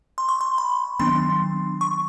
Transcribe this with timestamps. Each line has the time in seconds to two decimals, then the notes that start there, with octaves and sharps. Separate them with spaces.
0.18 C6
0.29 C#6
0.41 C6
0.58 B5
0.99 D#3 F#3 B3 D4 C6
1.81 C#6